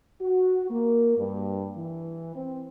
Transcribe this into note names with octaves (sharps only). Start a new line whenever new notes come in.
F#4
A#3
G2
E3
C4